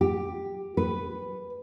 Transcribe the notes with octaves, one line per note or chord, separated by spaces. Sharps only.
G4
B4